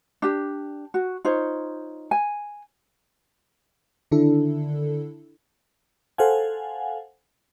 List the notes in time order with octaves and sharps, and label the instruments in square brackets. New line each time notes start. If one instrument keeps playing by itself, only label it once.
[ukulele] D4 G4
F#4
D#4 F4 C5 C#5
G#5
[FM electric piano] D3 D#3 D4 E4 A4
A4 C5 F5 F#5 G#5